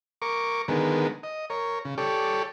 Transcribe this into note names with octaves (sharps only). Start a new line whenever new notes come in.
A#4 C#6 D6
D3 D#3 G#3 B3 A#4
D#5
A#4 C#5
C#3
G4 A4 C#5 D5